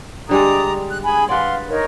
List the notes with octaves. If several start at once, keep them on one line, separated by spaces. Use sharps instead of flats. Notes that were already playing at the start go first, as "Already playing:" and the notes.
D3 G3 G#3 D5 A#5 D#6
F#6
G#4 G#5 B5
B4 D5 F5 F#5 C6
D#4 A#4 C#5